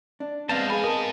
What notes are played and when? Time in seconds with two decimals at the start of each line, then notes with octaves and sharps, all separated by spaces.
0.20 D4
0.49 G#3 B3 C4 C5 D#5 F5 A5
0.70 G#2 G#4 G#5 B5
0.84 A#4 D#5 A5